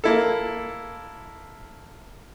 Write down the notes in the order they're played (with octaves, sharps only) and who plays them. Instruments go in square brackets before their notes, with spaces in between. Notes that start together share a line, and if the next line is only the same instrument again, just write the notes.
[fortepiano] A#3 E4 A4